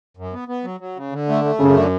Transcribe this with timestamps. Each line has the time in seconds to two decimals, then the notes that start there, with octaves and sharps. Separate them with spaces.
0.17 F#2
0.33 B3
0.48 B3
0.64 F#3
0.80 F#3
0.97 C#3
1.12 D3
1.29 A3
1.44 A3
1.60 F#2 C#3
1.76 D3